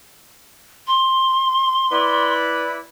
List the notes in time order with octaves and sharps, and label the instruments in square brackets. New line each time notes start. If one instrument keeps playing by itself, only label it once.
[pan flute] C6
[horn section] E4 B4 D5